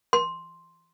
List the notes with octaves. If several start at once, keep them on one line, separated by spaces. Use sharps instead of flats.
C6